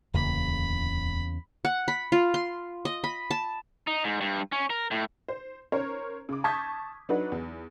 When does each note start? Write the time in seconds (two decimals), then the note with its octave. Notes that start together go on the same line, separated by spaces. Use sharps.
0.14 D1 E2 C#3 A#3 B5
1.65 F#5
1.88 B5
2.12 F4
2.34 C6
2.85 D#5
3.04 B5
3.31 A5
3.87 D#4
4.04 G#2
4.21 G2
4.52 C#4
4.70 A#4
4.91 A2
5.28 C5
5.72 C#4 A#4 C5 C#5
6.29 C#3 D6
6.44 A5 C#6 D#6 G6 G#6 B6
7.09 F#3 D4 D#4 F#4 B4
7.32 E2